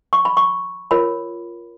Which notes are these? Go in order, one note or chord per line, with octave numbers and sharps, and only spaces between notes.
C#6
B5
C#6
F4 A#4 C#5 B5